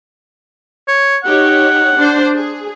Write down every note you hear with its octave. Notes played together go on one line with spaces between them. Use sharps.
C#5
D#4 G4 C#5 F#5
D4 C5
G#4